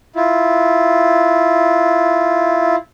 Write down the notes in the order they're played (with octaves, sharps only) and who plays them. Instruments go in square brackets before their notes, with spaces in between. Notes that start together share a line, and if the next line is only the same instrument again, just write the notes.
[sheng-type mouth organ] E4 F4